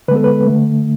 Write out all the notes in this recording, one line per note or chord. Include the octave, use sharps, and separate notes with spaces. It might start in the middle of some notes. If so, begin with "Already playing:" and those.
D3 G#3 B3 A4 B4
B4
D3 A3